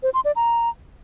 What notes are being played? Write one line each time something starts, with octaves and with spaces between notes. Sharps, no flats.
C5
C6
D5
A#5